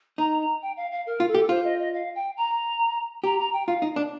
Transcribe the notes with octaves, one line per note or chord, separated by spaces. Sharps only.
D#4 A#5
A#5
G5
F5
F5
A#4
F4
A4
G4
F4 C5
D#5
D#5
F5
G5
A#5
G4 A#5
A#5
G5
F4 F5
D#4
D4